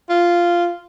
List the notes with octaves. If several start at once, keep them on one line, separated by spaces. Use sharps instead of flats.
F4